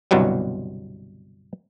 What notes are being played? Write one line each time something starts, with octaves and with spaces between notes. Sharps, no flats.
G1 C2 B2 F#3 G3